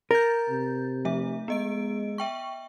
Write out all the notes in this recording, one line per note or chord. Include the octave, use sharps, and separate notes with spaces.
A#4 G6 A6
C3
F3 A3 E5
G#3 B3 D#5 D7
E5 G5 C#6